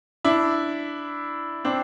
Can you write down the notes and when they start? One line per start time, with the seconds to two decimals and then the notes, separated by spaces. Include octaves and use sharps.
0.24 D4 E4
1.65 C4 D4